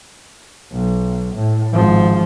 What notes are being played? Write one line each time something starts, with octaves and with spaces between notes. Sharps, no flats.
B1
A2
G#1 F3